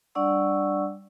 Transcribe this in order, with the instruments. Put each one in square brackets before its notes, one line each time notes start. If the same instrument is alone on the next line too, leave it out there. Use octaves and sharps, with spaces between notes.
[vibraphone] G3 D4 D5 F#5 C#6 E6